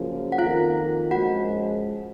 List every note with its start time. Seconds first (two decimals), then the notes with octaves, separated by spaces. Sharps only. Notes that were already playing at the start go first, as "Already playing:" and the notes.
Already playing: F#2 C#3 F3 A#3
0.32 F#5
0.38 F2 D#3 A#3 F4 F5
1.11 F#2 F3 G#3 F#4 F#5